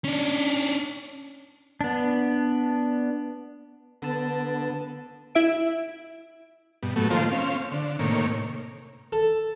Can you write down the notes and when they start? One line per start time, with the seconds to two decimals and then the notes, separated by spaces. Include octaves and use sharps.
0.04 C#4 D4
1.81 B3 D4
4.02 D3 B3 A5
5.35 E4 E5 D7
6.83 G2 B2
6.96 A2 F#3 A3 B3
7.10 D#3 F3 A3 A#3 F4 C5
7.32 C4 C#4 F5
7.71 D3
7.99 A2 C3 D#3 A#3 C#5
9.12 A4